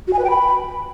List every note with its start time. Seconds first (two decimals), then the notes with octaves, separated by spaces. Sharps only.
0.07 F#4
0.13 G#5
0.19 B4
0.24 G5
0.30 B5